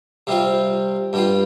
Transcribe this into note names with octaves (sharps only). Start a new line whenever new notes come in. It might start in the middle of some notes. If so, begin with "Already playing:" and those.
C3 G3 C4 F4
G2 G3 F4